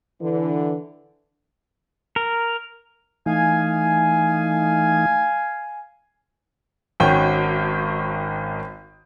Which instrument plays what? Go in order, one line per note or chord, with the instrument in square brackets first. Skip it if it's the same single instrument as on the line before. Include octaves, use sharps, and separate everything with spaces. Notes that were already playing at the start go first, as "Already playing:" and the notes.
[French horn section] D3 E3
[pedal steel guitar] A#4
[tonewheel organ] E3 A3 D#4 [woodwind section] F5 G#5
[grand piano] G#1 D#3 C#4 F#4 G5